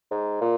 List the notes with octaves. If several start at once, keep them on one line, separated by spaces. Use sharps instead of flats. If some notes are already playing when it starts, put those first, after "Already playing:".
G#2
A#2